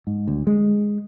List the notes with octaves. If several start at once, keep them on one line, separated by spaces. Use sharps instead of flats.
G#2
D2
G#3